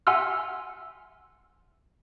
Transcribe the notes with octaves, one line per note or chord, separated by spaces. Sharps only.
E5 F#5 G#5 C6 E6 F6